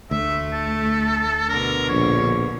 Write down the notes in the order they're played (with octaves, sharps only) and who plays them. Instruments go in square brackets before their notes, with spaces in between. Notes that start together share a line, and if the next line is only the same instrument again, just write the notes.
[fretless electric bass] D2 [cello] A3 [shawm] E5
[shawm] A4
[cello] B2 D3 [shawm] A#4
[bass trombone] A#1 [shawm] C#5